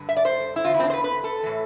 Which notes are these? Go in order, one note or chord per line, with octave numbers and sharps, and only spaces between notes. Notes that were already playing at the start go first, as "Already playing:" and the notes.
Already playing: G2 D3
E5
D5
C5
E4
E2 D3 F4
E4
C4
D4
C5
B4
B4
A4
A2 E3